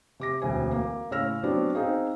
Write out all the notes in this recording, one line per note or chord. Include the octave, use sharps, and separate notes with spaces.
C3 D6 A#6
E1 D2 C4 G#5
A#3
A2 C#3 C#5 E6 F6 A#6
F#3 B3 C4 D4 D5
C4 D#4 G#4 F5